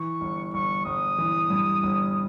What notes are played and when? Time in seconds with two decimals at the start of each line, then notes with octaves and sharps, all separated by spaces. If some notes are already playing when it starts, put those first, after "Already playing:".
Already playing: E3 C#6
0.21 G1
0.54 G1 C#6
0.86 G1 D#6
1.18 E3
1.50 G2
1.83 G1